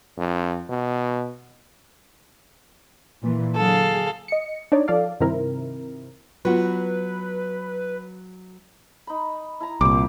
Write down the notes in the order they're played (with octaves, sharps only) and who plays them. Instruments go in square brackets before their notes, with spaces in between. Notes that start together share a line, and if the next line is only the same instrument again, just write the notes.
[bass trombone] F2
B2
[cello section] A#2 E3
[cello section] D3 F#3 G#4 [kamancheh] A4 F5
[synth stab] D#5 C#7
D4 D#4 C#5 D5
F3 A4 D5 F5
G2 C3 D#3 C4 E4 A#4
[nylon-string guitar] F#3 F#4 [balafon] B3 F4 [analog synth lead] B4
[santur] D#4 B5
E4 A5 A#5
[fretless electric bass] C2 A#2 [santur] G4 C5 [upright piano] D6